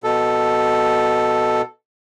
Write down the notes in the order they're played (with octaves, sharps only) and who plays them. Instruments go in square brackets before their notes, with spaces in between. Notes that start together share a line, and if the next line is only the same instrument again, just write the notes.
[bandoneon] B2 A4